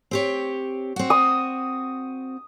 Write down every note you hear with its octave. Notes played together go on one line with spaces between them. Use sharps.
C4 G4 C#5
C4 F#4
D#6